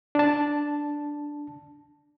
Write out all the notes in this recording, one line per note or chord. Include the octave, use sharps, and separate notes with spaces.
D4 A5